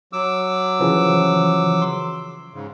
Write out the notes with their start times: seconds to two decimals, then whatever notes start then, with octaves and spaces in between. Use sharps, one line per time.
0.13 F#3 D6 E6
0.80 C#3 E3 F3
1.82 C6
2.54 G#2 C#3